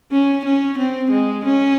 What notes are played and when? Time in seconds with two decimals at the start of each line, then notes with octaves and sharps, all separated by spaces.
0.12 C#4
0.45 C#4
0.78 C4
1.11 G#3
1.45 C#4